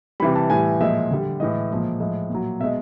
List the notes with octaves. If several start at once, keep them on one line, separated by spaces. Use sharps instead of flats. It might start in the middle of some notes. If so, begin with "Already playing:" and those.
C3 E3 G3 B5
A5
A2 E3 G3 G#5
A#2 F3 G#3 E5
D3 G3
A2 E3 G#3 D#5
A#2 F3 G#3
A2 F3 G#3
A#2 F#3
B2 G#3 E5